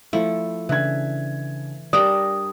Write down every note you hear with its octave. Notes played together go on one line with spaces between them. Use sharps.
F3 A3 E4
C#3 E3 D4 G#6
G3 D4 A#4 D5 A#5 D#6